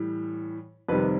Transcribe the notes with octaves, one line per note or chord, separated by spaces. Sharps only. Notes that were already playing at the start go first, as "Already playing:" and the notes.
Already playing: A2 E3 G3
F2 C3 D#3 G3 B4